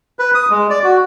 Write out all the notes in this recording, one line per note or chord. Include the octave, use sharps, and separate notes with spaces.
B4
D#6
G#3
D5
F#4